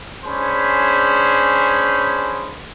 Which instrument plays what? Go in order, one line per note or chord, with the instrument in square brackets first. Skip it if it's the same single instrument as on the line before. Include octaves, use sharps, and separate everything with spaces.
[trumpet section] C#4 D4 G#4 C5 B5